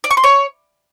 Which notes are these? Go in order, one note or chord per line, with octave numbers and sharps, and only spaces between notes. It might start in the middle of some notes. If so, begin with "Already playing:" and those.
D5
C#6
C6
C#5